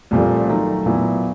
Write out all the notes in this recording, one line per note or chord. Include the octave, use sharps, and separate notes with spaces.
C2 A#2 F3 A3
D#3 F#3 A3
A#2 F#3 B3 E4